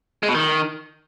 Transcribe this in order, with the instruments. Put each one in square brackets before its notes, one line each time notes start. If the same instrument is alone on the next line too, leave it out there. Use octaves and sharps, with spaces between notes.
[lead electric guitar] G#3
B2
D#3